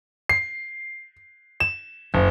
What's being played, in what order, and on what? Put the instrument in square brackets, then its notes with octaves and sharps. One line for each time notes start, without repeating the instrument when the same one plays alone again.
[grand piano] C7
E7
F#1